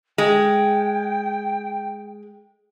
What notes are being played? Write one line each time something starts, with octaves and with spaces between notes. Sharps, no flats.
G#3 G5